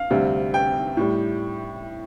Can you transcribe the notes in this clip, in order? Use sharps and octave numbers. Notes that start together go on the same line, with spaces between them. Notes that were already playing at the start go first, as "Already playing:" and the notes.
Already playing: F5
D2 C3 G3
G5
A2 G3